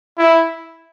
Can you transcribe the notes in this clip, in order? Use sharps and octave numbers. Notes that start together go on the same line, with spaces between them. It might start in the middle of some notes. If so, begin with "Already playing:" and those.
E4